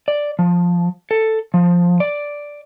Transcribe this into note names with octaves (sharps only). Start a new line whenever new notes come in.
D5
F3
A4
F3
D5